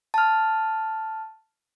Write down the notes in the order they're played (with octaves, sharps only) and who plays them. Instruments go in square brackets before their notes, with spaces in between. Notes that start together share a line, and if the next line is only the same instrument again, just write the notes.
[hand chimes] A5 F6